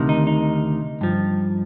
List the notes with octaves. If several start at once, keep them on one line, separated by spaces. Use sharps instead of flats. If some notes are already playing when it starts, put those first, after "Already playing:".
Already playing: D2 C3 D#3
D#4
D#4
G2 F3